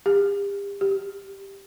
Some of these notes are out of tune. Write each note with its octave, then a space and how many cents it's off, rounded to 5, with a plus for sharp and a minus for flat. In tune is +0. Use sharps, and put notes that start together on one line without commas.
G4 +35
G4 +5